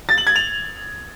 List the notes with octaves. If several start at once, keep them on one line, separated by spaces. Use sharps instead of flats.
A6
F#7
G#6
F7